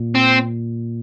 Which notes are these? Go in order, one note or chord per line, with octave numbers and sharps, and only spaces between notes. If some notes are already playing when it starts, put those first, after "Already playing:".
Already playing: A#2
C4